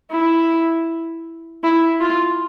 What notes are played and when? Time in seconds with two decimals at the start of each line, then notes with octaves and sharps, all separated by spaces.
0.11 E4
1.64 E4
2.00 F4